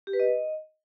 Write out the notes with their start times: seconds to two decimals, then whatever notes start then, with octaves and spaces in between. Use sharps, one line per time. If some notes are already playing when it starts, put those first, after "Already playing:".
0.07 G4
0.13 B4
0.20 D#5